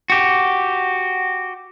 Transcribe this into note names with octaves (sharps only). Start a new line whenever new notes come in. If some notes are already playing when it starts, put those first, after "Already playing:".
F#4 G4